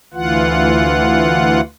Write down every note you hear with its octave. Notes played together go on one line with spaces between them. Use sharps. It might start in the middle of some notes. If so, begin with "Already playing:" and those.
D2 E3 F4 F#5